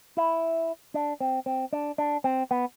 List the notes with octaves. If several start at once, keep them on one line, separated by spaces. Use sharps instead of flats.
E4
D4
C4
C4
D4
D4
C4
B3